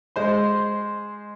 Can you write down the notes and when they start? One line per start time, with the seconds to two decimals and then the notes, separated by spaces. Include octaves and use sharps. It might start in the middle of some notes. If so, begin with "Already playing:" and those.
0.16 G#3 C5 C6